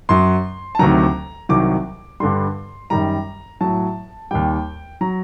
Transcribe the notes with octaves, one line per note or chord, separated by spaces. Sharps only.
F#2 F#3 C6
A5
D2 C3 D#3 F#3 A#5
C2 C3 D#3 F#3 D6
G2 D3 G3 C6
F#2 D#3 G3 A#5
A2 F#3 A5
D#2 D#3 G3 G5
F#3 A#5